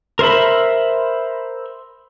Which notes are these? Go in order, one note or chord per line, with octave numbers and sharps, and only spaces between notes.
A#4 C5 E5 B5